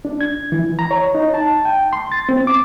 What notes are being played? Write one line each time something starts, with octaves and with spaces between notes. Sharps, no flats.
D4
G#6
E3
A#5
C#5
D#4
A5
G5
C6
A6
C4
D6